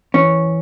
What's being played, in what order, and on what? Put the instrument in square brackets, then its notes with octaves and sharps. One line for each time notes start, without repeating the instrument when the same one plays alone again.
[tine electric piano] E3 [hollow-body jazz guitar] C#4